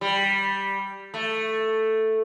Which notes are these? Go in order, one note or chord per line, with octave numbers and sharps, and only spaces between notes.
G3
A3